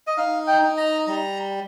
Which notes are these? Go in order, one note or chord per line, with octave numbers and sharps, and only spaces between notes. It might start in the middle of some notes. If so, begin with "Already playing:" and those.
D#5
D#4 F5
G5
D#4
A#5
G3 A#5